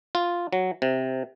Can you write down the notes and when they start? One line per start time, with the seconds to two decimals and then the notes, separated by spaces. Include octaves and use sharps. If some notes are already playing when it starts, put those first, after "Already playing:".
0.15 F4
0.53 F#3
0.82 C3